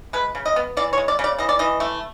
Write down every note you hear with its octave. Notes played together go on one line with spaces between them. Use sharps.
G#3 B4
C#3
D#5
B3
E3 D5
C#5
G#3
D5
C#3
D5
E3 D#5
D5
E3 D#5
A3